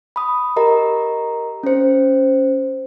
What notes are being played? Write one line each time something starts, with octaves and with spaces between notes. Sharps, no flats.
B5 D#6
G4 A#4 D#5 A#5
C#4 C5